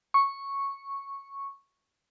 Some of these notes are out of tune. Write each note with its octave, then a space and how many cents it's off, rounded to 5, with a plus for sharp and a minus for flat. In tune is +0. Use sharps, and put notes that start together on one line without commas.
C#6 -5